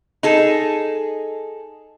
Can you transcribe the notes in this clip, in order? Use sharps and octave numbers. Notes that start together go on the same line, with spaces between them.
D#4 G#4 A4